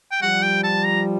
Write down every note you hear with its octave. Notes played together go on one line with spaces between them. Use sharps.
G5
F3 G3 F#5
G5
A5
A#5